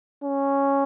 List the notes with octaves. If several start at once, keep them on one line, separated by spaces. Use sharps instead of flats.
C#4